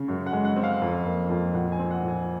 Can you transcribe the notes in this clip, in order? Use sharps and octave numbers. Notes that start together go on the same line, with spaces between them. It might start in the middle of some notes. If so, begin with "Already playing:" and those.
Already playing: C#3
F#2
F#5
G#3
F#5
C4
F5
F2
A#3
F2
A#2 F#5
G#5
C4
F#5
A#2
G#5